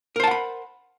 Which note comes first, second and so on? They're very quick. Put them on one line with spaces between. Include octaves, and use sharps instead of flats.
A#4 C5 A5 F#5 B5